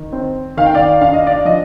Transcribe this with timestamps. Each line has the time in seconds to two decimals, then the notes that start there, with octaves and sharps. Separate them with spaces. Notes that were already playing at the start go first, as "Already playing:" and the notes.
Already playing: D#3
0.13 C4
0.57 D#3 F5
0.66 G5
0.75 D5 F5
1.01 D4 F5
1.14 D#5
1.27 D5 F5
1.45 F3 D#5